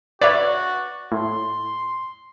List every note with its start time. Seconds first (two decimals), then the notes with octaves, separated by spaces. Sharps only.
0.21 F#4 B4 C#5 D5 E5
1.12 A2 C6